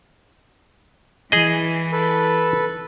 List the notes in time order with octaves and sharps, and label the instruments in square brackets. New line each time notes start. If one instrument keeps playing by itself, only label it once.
[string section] E3 [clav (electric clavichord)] G#4 D#5
[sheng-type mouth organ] A4 B4